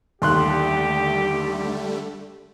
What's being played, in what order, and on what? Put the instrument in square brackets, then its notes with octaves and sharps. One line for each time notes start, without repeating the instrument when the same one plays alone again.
[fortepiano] D#2 C6 F#6 [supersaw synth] D3 G3 A3 [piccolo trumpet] G4